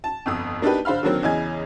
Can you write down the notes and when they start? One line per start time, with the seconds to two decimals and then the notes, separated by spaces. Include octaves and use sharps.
0.04 A5
0.26 G1 F2 D#6
0.62 A#3 D4 D#4 G4 B4
0.85 D3 C5 F5 B5 F6
1.03 D3 D#3 F#3 A#3 C4
1.23 E2 C#3 E3 D#5 G#5 G#6